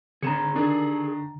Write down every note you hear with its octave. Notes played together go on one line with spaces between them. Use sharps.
D3 C4 G#4 A#5 C#7 E7
D#3 D4 G#4 A4